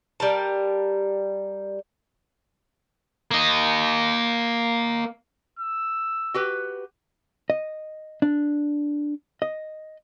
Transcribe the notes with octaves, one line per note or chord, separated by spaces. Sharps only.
G3 A#4 A5
A#3 D#5
E6
F#4 G4 B4
D#5
D4
D#5